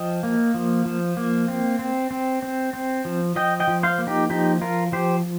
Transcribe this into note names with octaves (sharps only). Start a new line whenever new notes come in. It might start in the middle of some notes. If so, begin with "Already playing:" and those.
Already playing: F3 D#5 G5
A#3
F3
F3
A#3
C4
C4
C4
C4
C4
F3
F3 D#5 G5
D#5 G5
F3
C5 F5
A#3
D#4 G4
F3 D#4 G4
F3 F4 A#4
F3 G4 C5